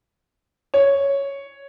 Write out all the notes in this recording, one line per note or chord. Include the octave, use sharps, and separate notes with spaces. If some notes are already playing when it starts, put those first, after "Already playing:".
C#5